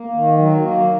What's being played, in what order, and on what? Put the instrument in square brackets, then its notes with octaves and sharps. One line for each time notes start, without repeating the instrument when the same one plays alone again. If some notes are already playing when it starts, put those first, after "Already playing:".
Already playing: [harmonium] A#3
D#3
F#3
A#3